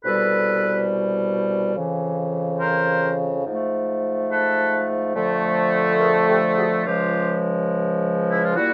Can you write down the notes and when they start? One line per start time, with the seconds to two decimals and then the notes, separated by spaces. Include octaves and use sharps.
0.04 C2 B2 G3 A4 B4
1.74 F2 C#3 E3
2.59 A#4 C5
3.45 G#2 F3 A3
4.30 A4 B4
5.15 F2 D3 F3 A3
6.00 G#4 A#4
6.28 G4 A4
6.57 F#4 G#4
6.85 C#2 C#3 F3 G#3 F4 G4
8.29 E4
8.42 F4
8.55 A#2 G3 A#3 E4 F#4